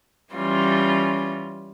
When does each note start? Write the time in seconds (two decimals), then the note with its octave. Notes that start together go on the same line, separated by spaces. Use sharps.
0.33 E3 G3 C#4 F4